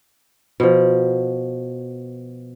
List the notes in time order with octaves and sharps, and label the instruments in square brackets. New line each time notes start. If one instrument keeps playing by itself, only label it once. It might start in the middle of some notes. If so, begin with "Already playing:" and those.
[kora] B2 F3